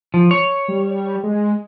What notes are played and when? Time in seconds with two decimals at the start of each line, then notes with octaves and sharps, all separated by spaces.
0.14 F3
0.31 C#5
0.68 G3
1.24 G#3